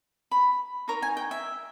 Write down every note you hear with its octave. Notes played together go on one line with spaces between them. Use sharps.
B5
D#4 A#4 C#5 A#5
G#5
G5
E5